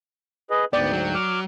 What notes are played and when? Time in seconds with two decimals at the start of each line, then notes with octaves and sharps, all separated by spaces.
0.50 G#4 B4 D#5
0.73 D2 G#2 B3 D5 G5
0.93 F#3
1.15 D6 F6